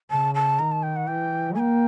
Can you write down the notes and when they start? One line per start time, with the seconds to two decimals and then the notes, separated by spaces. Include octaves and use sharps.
0.11 C#3 A5
0.35 A5
0.59 D#3 A#5
0.72 A5
0.83 G5
0.96 F#5
1.07 E3 G5
1.55 A#3 G5 G#5